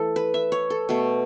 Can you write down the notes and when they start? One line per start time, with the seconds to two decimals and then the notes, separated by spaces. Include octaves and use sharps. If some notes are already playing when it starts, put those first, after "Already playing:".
Already playing: E3 A3 A4
0.16 B4
0.34 E5
0.52 C#5
0.70 A4
0.89 B2 A3